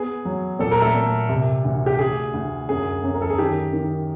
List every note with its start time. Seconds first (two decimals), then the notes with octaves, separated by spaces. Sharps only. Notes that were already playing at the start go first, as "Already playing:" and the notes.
Already playing: B3 G#4
0.25 F#3
0.59 A#2 A4
0.71 A#4
0.82 A3 A4
0.95 A#2
1.29 C3
1.65 D2
1.86 G4
1.99 D2 G#4
2.34 D2
2.69 F#2 G#4
3.03 F#2
3.14 A#4
3.21 A4
3.30 G#4
3.38 D#3 G4
3.73 D#3